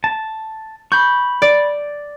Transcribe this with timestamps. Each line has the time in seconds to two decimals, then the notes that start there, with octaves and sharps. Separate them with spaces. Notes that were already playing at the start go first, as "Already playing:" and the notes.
0.04 A5
0.92 B5 C#6 G6
1.42 D5